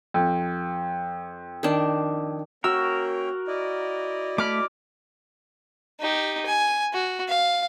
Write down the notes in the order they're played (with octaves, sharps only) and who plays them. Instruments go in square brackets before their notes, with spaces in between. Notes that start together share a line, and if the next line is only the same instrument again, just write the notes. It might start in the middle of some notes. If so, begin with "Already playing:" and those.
[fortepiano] F2
[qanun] D#3 D4
[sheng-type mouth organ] A#3 C#4 G5 [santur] F#4 [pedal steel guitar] A#4 [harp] E6
[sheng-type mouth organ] E4 D5 D#5
[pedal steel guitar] A3 B5 [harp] D6 F6
[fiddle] D#4 G4
G#5
F#4
F5